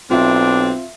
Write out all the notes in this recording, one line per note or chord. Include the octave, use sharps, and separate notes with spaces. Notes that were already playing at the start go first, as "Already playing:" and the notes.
B1 C4 D4 F4 E5